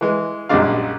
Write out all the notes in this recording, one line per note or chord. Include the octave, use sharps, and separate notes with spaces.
E3 G#3
A#1 F#2 G3 G#3 D4 F5